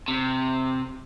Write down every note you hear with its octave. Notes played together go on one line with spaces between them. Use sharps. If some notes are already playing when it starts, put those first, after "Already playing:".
C3